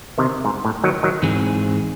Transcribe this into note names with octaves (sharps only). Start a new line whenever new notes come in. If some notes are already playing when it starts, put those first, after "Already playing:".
C3 D#3
G#2
A2
D#3 F#3
D#3 F#3
G#2 E3 C4 D#4 G#4